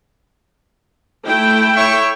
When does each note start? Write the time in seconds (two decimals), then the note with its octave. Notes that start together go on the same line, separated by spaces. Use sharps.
1.27 A3 E4 G5
1.76 C#5 E5 C#6